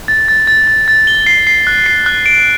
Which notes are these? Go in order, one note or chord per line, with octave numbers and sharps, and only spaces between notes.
A6
A6
A6
A6
A6
G7
C7
C7
F#6
C7
F#6
D7